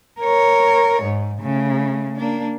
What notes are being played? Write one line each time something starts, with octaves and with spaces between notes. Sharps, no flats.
A#4 C#5
G#2
C#3 A3
A#3 D4